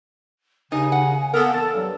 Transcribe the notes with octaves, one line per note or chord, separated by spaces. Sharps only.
D#2 C#3 D#4 G#5
F#5
A#3 B3 A4 A#4
E2 A5
G2 F#3